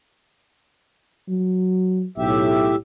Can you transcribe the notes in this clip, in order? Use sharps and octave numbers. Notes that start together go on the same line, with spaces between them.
F#3
B1 A2 G4 E5